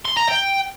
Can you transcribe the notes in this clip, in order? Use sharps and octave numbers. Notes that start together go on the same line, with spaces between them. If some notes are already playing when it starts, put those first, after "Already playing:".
C6
A#5
G5